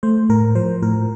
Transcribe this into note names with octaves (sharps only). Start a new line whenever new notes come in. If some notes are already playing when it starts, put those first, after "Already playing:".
A3 C5
A2 A#4
F3 C5
A2 A#4